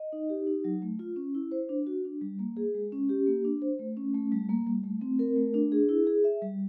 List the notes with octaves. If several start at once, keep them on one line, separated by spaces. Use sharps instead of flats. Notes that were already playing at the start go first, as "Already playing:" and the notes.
Already playing: D#5
D#4
G4
D#4
F#3
A3
F4
C#4
E4
C5
D4
F#4
D4
G3
A#3
G#4
G#3
C#4
G4
A#3
D4
C5
A3
C#4
A3
G3
A#3
G3
A3
C4
A#4
A3
D4
G#4
E4
G#4
E5
G3